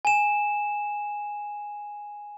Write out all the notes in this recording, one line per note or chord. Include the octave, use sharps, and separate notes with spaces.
G#5 E7